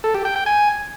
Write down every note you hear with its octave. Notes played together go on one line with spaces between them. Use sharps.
A4
G4
G5
G5
G#5